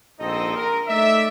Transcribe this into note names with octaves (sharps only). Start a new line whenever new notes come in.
A#1 G#2 C4 D#4 A4 D#5
A#4
A3 D#4 D5 E5